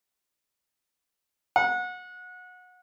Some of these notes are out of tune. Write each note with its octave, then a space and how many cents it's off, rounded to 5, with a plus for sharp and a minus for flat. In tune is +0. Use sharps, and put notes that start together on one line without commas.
F#5 -25